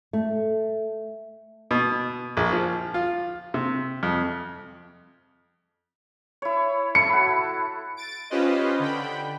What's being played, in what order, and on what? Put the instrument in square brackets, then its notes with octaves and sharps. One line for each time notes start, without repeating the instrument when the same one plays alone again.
[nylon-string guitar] A3
[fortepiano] B2
A#1
F3
F4
C3
F2
[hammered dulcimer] E4 C#5
[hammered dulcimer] E4 A4 [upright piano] C#7
[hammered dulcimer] F#4 B5
[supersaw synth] A6 D7
C#4 F4 G4 B4 C5 D#5
D3 G5 B5